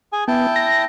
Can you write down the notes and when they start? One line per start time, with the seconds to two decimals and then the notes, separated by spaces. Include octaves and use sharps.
0.13 G#4 G#5
0.28 B3 E4 G5 A5
0.56 A#6